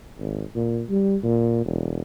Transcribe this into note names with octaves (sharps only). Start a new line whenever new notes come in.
G#1
A#2
G3
A#2
E1